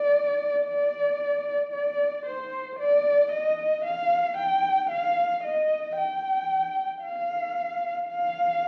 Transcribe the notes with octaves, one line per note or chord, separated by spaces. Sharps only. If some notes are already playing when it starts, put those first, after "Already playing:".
Already playing: D5
D5
D5
C5
D5
D#5
F5
G5
F5
D#5
G5
F5
F5